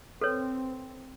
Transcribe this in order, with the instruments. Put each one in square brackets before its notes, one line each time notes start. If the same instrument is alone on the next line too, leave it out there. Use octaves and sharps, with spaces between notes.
[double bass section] C4 [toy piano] A4 B4 C#5